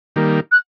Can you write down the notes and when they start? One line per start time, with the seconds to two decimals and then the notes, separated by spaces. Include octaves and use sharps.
0.16 D#3 G3 A#3
0.52 F#6